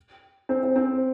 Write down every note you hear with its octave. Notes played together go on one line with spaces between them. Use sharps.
C4
C4
C4